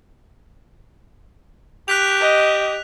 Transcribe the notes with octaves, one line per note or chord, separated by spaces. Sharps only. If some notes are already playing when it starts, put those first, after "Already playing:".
G4 F#6 B6 F7
D#5